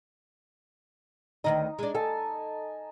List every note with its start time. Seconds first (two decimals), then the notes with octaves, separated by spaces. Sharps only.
1.44 D2 D#3 D#4 D#5
1.79 G#3 D4
1.95 A4 G#5 A5